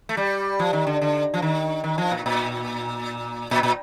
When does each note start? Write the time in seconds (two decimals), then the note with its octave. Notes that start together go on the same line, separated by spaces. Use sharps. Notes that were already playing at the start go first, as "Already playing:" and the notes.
0.09 A3
0.17 G3
0.59 F3
0.73 D#3
0.87 D3
1.01 D3
1.34 F3
1.42 D#3
1.84 D#3
1.98 F3
2.11 A#2
2.26 A#2
3.51 A#2
3.63 A#2